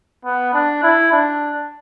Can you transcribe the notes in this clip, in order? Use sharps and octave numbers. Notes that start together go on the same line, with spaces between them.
B3
D4
E4
D4